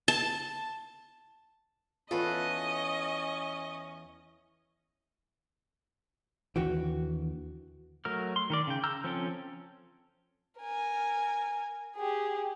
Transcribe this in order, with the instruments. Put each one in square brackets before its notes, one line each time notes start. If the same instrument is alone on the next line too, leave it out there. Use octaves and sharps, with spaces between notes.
[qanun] A5
[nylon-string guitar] E2 F4 [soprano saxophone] C#4 [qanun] A4 B4 [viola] D#5
[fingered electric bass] D#2 D3 E3 [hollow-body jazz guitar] F#4 G5
[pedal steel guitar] F#3 A3 A#4 F6
C6
D#3 A#4 D5
C#3 G5
A#5 E6 F6 G6
F3 C4 C#4 A4 G5
[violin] A#4 G#5
G4 G#4